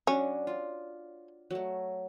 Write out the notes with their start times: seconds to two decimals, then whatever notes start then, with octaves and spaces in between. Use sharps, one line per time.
0.07 F#3 C#4 D4
0.47 F4
1.51 F#3 A3